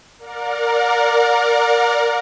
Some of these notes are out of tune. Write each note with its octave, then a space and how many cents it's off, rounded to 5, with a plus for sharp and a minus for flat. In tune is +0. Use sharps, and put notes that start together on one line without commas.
A#4 +0 D5 +0 F#5 -45